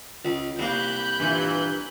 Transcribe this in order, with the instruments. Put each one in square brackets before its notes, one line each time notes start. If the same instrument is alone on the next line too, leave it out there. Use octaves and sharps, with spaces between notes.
[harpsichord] C#2
[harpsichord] C2 A#3 [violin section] B5 F#6 G6
[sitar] G2 A#2 E3